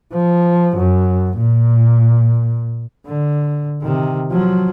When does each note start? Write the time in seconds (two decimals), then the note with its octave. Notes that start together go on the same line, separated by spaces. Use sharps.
0.14 F3
0.77 F#2
1.38 A#2
3.06 D3
3.82 C3 D#3
4.31 F3 F#3